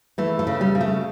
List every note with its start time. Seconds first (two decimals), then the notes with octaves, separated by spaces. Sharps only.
0.18 E3 A3
0.39 A3
0.47 C#3
0.61 G3
0.75 C#3
0.81 A3